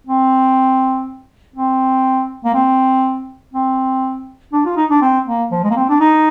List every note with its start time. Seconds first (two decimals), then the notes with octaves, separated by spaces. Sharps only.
0.07 C4
1.56 C4
2.45 A#3
2.54 C4
3.53 C4
4.52 D4
4.65 F4
4.76 D#4
4.90 D4
5.02 C4
5.26 A#3
5.51 F3
5.64 G#3
5.70 A#3
5.76 C4
5.89 D4
6.00 D#4